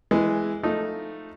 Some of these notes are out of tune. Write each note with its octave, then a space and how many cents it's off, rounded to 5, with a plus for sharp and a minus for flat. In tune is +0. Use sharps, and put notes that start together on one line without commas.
E3 +0 G#3 +0
F3 +0 A3 +0 D#4 +0